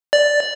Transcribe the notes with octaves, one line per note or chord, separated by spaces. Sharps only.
D5